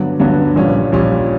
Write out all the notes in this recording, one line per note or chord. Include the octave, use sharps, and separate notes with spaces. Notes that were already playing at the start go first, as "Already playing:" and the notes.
Already playing: G2 D3 F#3 B3
G2 D3 F#3 B3
A#1 A#2 G3 C#4
A#1 A#2 G3 C#4